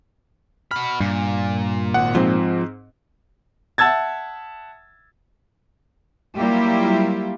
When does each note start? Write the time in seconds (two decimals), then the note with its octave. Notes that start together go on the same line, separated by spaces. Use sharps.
0.71 F#4 B5 F6
1.01 G2 A#2
1.94 G#1 F#5
2.15 G#2 F3 C4
3.78 E5 F#5 A5 E6 G#6 A6
6.37 F#3 G3 A#3 E4 F4 G4